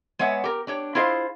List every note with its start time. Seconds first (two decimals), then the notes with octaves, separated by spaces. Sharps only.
0.19 G#3 B3 C#5 E5 F#5
0.44 G4 A#4
0.67 D4 G4 C#5
0.95 E4 F4 G#4 C5 D#5 F5